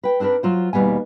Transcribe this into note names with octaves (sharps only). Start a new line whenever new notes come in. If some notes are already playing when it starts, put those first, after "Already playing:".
B4 G5
C4 D4 G4 A#4 B4
F#3 F4 C5
D#2 B2 G3 B3 G#5